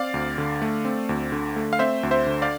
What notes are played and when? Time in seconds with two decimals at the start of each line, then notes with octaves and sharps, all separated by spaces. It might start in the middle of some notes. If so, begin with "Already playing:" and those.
Already playing: C4 D5 F5
0.14 D2
0.38 D3
0.62 A3
0.85 C4
1.09 D2
1.32 D3
1.56 A3
1.73 F5
1.79 C4 C5 E5
2.03 D2
2.11 C5 E5
2.27 D3
2.42 D5 F5